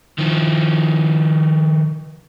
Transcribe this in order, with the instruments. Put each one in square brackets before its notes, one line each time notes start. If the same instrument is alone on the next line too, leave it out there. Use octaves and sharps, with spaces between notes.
[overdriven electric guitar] D#3 F3